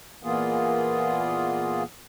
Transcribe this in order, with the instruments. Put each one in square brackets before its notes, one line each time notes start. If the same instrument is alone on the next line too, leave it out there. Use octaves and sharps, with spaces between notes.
[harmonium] A#2 E3 A#3 B3 F4 G#4